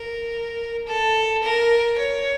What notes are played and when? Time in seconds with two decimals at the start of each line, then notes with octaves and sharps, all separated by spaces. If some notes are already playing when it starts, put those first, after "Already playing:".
Already playing: A#4
0.86 A4
1.43 A#4
1.98 C#5